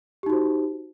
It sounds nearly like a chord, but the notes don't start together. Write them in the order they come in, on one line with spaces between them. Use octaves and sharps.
G4 D#4 F#4 C5